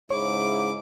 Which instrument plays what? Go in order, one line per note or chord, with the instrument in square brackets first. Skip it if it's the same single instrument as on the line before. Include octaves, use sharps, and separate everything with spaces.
[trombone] G#2 [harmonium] C#3 E4 [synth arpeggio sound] C#5 [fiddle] D6